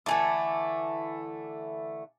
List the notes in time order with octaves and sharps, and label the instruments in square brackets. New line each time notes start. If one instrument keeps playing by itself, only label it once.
[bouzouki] D3 E3 A3 [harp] G#5 A5 D6